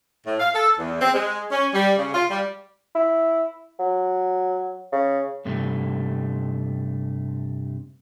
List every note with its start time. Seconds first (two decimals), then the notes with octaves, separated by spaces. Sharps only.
0.27 A2
0.40 F5
0.55 A4
0.79 E2
1.01 C4
1.14 G#3
1.52 C#4
1.74 G3
1.98 C#3
2.15 F4
2.31 G3
2.95 E4
3.79 F#3
4.92 C#3
5.45 G2 C3 A3